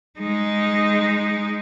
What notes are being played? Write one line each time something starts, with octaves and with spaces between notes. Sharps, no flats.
G#3 D#4